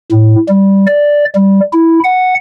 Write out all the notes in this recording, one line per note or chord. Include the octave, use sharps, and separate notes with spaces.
A2
G3
D5
G3
E4
F#5